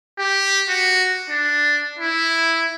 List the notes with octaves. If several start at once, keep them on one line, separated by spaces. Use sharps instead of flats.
G4
F#4
D4
E4